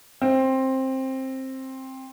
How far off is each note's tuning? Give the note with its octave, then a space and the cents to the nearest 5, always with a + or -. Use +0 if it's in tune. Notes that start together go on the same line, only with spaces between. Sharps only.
C4 +15